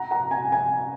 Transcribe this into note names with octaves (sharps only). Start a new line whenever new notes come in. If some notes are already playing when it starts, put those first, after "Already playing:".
Already playing: F#5 A#5
F#5 A#5
G#5
G#5